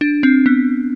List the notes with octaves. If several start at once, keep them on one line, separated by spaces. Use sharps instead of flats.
D4
C4
B3